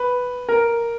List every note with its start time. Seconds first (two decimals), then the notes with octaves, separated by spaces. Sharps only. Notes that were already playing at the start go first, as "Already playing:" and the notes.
Already playing: B4
0.49 A#4